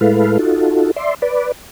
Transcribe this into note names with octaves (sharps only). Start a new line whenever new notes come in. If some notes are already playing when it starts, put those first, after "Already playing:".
A2 G#3 E4 A4 B4 F5
D#4 F4 F#4 A4
D5 E5 C6
B4 D5